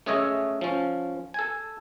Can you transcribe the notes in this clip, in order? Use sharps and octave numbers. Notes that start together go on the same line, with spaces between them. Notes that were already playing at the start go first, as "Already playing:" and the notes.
A3 C#4 G#4 C#5 D#5 E5
F3 C#4
A4 G#5